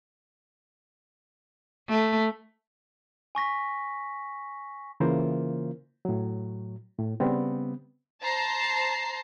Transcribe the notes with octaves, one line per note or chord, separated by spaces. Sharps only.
A3
G#5 C#6 A#6 B6
C#3 E3 A#3 F4 A#4 C5
A2 F#3
A2
C#3 G3 B3 C4
C5 A5 A#5 C7